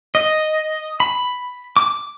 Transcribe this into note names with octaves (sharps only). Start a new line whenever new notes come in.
D#5
B5
D6